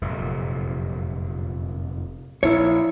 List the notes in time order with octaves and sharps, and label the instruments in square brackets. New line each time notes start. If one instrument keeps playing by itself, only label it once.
[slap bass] F1 F#2 A#2
[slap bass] A#1 [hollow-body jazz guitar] E4 C#5